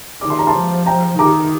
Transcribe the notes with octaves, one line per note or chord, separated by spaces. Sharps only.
D#3 D6
C6
A#5
A5 C6
F3
G5 A#5
D#3 A#5 D6